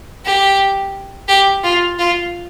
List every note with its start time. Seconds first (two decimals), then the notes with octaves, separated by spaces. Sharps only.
0.25 G4
1.28 G4
1.63 F4
1.99 F4